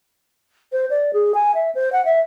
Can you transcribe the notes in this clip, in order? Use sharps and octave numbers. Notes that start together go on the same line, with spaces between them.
C5
D5
G#4
G#5
E5
C5
F#5
E5